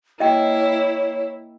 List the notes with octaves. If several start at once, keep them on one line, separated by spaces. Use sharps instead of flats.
A#3 E4 C#5 D#5 G5